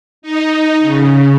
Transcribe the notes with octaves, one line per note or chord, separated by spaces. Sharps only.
D#4
C#3